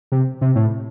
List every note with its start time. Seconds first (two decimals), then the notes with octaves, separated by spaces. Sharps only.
0.12 C3
0.41 C3
0.56 A2